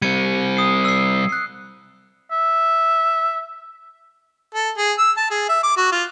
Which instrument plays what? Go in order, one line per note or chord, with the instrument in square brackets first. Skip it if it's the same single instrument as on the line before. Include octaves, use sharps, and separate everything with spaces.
[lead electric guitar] G3 C4 [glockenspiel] G#6 C#7 D#7
[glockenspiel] D#6 C7
E6 C7
F#6 C7
[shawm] E5
[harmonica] A4
G#4
E6
A5
G#4
E5
D6
F#4
F4